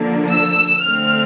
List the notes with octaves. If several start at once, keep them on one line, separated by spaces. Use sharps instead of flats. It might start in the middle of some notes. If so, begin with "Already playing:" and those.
Already playing: D3 F3 A#3 D4
E6
D3 A3 C4 F6